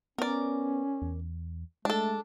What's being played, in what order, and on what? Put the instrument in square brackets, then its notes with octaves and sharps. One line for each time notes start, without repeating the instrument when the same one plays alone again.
[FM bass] B3 [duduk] C#4 [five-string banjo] A#4 D5
[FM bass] E2
[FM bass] G#3 [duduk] A3 [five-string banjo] D4 A4